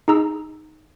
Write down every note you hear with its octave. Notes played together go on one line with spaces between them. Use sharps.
D#4 G#4 A#5 E6